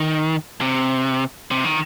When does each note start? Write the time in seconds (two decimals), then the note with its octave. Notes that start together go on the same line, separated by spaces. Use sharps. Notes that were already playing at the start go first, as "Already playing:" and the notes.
Already playing: D#3
0.61 C3
1.51 C3
1.64 D#3